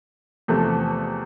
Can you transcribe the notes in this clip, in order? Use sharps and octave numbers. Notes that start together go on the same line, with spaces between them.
E2 C3 F3 A3